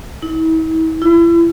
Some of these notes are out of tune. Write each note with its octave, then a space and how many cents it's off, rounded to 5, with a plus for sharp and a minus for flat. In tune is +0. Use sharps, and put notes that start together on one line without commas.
E4 -45
E4 +35